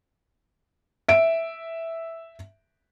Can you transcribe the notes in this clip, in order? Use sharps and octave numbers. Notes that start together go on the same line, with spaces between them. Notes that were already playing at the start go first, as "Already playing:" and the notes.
E5 D7